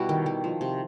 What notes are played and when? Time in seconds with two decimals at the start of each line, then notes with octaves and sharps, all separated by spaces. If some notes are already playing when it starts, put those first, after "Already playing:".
Already playing: B2 G3 E4 F#4
0.09 D#3
0.26 D#3
0.44 F3
0.61 C3